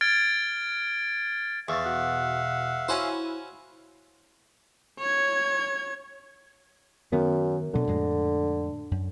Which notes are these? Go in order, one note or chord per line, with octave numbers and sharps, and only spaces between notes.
F6 G#6 A6 D7
E2 E5 F5 C#6 A6
B2 F#5
C#4 E4 F#4 C5 G#5
C#5 G#6
F#2 D#3 B3
B2 D3 F#3
F2 A2 G#3
F#2